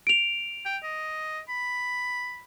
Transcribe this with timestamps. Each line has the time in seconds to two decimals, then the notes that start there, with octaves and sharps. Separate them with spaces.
0.07 D7 F7
0.66 G5
0.83 D#5
1.49 B5